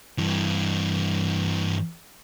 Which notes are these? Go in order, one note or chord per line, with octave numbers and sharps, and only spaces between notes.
G2 E3